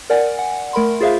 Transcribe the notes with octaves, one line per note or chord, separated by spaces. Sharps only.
A#4 D5 F#5 G#5
F#5
A3 A#4 B5 C6
F4 G#4 C5 E5 F5